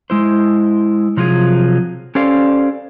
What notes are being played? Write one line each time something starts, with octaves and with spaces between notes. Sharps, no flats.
G#3 E4 C5
C3 F3 F#3 F4 G#4
C#4 G4 A4 C5 D5 F5